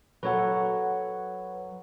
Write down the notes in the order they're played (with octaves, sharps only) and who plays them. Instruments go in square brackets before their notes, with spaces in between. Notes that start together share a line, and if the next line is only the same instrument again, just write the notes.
[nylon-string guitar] F#3 A4 F#5 [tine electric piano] B4 C#5